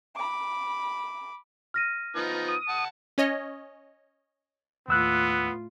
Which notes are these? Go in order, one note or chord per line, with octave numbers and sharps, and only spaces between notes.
B5 D6
F6 A#6 D#7
F3 B3 D#4
D#6
F#5 A5
C#4 C#5 D#5
D#2 A2 B3 F4 E6 F#6